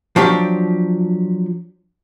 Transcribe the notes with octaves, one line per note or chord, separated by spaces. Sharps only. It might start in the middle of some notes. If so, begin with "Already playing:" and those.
F3 F#3 D4 G4